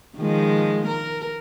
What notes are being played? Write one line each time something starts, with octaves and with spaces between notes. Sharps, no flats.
D#3 F3 G#3
A#4